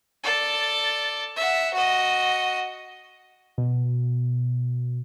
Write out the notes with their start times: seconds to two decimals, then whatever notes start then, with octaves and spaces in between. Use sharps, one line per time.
0.23 A4 D5
1.36 E5 F#5
1.73 F#4 D#5
3.58 B2